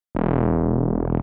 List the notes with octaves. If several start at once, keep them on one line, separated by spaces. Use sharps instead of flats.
E1